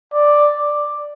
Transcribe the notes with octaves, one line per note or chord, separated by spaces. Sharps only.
D5